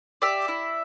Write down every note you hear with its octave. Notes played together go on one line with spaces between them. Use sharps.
G4 D5 E5
E4